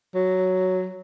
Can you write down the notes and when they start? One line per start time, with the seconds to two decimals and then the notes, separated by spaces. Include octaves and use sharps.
0.15 F#3